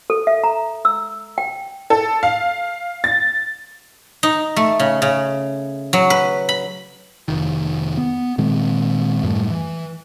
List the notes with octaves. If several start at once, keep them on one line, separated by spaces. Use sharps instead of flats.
A4
E5
A#5
E6
G5
A4
F5
A6
D#4
A3
C#3
C#3
F#3
B4
B5
F1 D#3
B3
A#2 D#3 G#3 C4
F#2 A2 G3 A3
E3